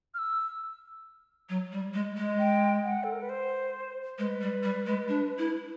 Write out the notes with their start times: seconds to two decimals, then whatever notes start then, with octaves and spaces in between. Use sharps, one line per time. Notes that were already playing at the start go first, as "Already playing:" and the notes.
0.14 F6
0.18 E6
1.49 F#3
1.72 G3
1.94 G#3
2.17 G#3
2.39 G5
2.84 F#5
3.04 A4
3.12 A#4
3.21 B4
3.29 C5
4.18 G#3 B4
4.41 G3
4.63 G3
4.86 G#3
5.09 D4
5.38 E4